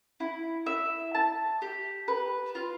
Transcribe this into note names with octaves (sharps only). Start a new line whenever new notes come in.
E4
E5
A5
G4
B4
F4